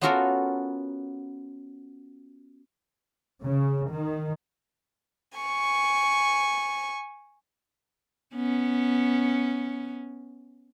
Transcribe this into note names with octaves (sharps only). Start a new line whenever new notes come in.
B3 C#4 F4 F#4 A4 A#4
C#3
D#3
G#5 C#6
B3 C#4